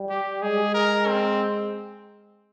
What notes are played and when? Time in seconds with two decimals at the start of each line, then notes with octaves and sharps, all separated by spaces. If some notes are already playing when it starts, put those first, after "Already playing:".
Already playing: G3
0.10 G4
0.42 G#3 G#4
0.74 A#4
1.08 C4